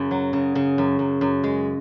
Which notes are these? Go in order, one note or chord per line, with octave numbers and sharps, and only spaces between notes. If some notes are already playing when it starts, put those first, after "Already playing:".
Already playing: F#2 C#3
F#3
C#3
C#3
F#2
F#2
F#2
G#3